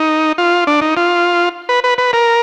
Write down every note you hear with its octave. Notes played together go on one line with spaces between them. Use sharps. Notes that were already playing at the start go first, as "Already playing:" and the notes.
Already playing: D#4
F4
D4
D#4
F4
B4
B4
B4
A#4